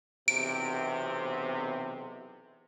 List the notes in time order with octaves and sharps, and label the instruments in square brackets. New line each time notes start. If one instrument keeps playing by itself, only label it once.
[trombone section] B1 E2 C3 [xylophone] D7